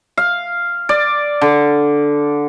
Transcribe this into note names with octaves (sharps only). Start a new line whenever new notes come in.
F5
D5
D3